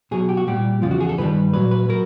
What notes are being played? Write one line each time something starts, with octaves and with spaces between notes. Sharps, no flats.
B2 F#3 G#4
G4
F#4
A#2 G3 G4
E2 C#3 F3 F4
F#4
G#4
A4
G2 D#3 G3 B4
A#2 F#3 B4
B4
F#3 A#4